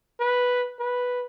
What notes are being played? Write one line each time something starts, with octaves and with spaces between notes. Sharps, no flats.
B4
B4